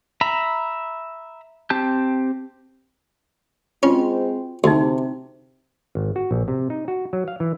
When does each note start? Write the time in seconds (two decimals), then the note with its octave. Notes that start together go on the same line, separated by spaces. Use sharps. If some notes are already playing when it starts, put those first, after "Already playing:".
0.21 E5 A#5 B5
1.70 C4 G4 A5 G6
3.83 G#3 C4 C#4 F4 F#4
4.64 D2 C3 D#4 E4 F#4
5.95 G#1
6.16 F#4
6.31 A#1
6.48 C3
6.70 D#4
6.88 F#4
7.13 F#3
7.28 F5
7.40 E3